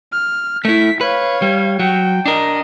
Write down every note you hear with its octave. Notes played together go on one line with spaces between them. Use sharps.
F6
A3 E4 B6
B4 C#5 F5
G3
F#3 G5
D4 A#4 D#5